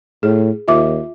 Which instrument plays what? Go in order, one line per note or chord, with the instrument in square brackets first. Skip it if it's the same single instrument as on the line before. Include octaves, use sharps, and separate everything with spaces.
[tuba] A2 [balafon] G#4
[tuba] D#2 [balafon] F4 E5 D6